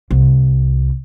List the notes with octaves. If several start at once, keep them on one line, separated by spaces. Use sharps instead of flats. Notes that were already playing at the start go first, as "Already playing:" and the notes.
C2